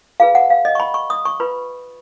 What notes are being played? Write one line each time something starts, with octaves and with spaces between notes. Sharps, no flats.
F4 G#4 B4 F5
F#5
F5
D#5
C#6
B5
C#6
D#6
C#6
F4 B4 B5